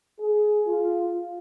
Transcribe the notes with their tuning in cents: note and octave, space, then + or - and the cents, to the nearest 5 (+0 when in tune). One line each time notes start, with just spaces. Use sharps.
G#4 +20
F4 +0